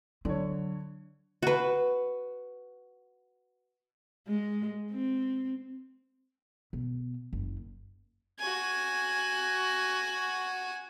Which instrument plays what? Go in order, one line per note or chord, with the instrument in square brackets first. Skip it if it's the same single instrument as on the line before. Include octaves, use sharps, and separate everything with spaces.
[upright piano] D3 C#5 [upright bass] F#3
[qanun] F#4 B4
[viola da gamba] G#3
C4
[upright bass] B2
F#1
[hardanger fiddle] F#4 G#5